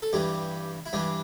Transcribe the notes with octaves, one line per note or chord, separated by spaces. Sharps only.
A4
G2 E3 G3 G4
E4
G2 E3 G3 D4